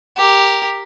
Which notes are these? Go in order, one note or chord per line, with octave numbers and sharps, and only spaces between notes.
G4 A#4